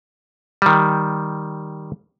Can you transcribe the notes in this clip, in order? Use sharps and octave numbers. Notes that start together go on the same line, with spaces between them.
D#3 G3